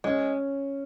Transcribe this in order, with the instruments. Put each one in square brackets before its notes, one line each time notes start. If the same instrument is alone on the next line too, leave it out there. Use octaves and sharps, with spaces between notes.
[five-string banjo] G#3 [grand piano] C#4